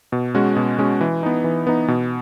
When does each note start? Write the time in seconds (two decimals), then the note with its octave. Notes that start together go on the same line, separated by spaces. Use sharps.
0.12 B2
0.35 G#3 C#4 F#4
0.56 B2
0.79 G#3 C#4 F#4
1.01 E3
1.23 B3 D#4
1.44 E3
1.67 B3 D#4
1.88 B2